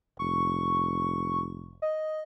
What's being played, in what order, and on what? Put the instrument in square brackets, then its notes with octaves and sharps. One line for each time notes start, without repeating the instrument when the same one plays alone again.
[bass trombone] F1 [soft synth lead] C#6
[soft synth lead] D#5